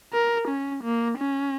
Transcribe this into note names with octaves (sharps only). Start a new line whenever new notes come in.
A#4
C#4
A#3
C#4